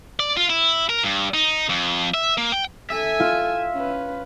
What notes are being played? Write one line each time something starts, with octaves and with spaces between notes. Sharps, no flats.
D5
F4
E4
A#4
G2
D#4
F2
E5
A#3
G5
A4 E5 G#5
F4
C#4 B4